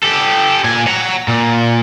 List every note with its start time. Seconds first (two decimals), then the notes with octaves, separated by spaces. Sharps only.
0.04 G4 A4
0.64 A#2 G#5
0.87 F#5 A#5
1.28 A#2